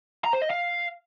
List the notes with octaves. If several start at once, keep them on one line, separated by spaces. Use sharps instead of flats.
A#5
C5
D#5
F5